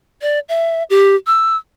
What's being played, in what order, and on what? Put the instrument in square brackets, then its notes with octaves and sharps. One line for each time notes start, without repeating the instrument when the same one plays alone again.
[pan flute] D5
E5
G4
E6